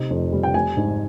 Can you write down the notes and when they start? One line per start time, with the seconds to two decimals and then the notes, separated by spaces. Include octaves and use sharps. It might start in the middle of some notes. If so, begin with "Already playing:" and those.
Already playing: C3 D#4
0.11 F2
0.33 G3
0.43 G5
0.54 G3 G#5
0.77 G#2